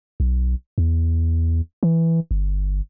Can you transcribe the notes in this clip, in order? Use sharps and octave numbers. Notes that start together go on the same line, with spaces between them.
B1
E2
E3
G1